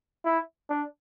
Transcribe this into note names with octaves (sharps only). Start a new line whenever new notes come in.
E4
D4